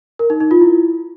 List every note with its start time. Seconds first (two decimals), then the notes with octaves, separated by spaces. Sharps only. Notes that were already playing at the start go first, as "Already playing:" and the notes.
0.19 A#4
0.30 D#4
0.40 D#4
0.51 F4
0.61 E4